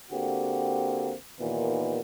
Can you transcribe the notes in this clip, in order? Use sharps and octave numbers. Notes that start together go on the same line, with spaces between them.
D3 A#3 C4 F#4 G4
D#2 A#2 D#3 E3 B3